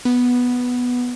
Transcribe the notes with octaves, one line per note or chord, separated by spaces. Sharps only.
B3